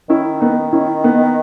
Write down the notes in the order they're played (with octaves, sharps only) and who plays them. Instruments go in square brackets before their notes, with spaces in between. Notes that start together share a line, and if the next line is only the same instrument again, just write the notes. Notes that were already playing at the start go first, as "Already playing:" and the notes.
[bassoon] D#3 [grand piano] C#4 E4
[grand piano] B3 D#4
C#4 E4
B3 D#4